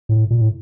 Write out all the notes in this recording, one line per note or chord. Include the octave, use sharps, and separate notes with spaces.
A2
A#2
A2